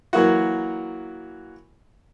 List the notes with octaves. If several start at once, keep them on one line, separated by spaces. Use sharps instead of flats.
E3 F#3 A#3 F#4